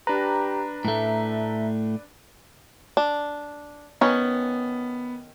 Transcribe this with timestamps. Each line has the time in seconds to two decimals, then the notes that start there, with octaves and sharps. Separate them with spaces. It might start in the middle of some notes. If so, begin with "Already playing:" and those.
0.07 D4 G4 B4 A#5
0.85 A2 A3 E5
2.97 D4
4.01 D#3 B3 C#4